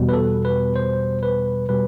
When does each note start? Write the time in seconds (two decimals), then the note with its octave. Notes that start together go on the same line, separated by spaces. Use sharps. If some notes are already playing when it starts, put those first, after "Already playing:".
Already playing: E2 B2 G3
0.09 B4
0.13 A4
0.45 B4
0.76 C5
1.23 B4
1.69 B2 G3 B4